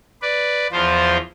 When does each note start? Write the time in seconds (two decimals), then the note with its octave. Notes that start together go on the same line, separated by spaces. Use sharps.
0.22 B4 D5
0.72 E2 F3 F4 C5